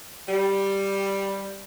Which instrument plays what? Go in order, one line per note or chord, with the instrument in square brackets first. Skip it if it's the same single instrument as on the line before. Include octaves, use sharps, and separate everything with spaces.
[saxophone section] G3